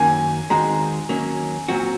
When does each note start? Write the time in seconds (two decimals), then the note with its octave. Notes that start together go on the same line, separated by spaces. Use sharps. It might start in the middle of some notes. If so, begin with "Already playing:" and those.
Already playing: F#2 D#3 F#3 A#3 C#4 G#5
0.50 D#3 G#3 C4 F#4 A#5
1.09 D#3 F#3 A#3 C#4
1.68 A#2 F#3 C4 F#4